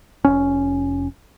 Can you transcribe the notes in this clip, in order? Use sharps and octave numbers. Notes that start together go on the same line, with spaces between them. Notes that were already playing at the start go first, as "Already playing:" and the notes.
F1 C#4